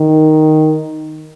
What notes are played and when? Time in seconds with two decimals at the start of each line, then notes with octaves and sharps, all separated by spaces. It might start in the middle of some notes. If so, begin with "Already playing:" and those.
Already playing: D#3